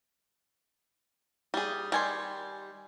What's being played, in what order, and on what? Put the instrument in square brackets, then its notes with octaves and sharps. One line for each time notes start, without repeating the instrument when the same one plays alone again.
[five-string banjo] G3 G#4
[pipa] D#3 G#5 C6 [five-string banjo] G3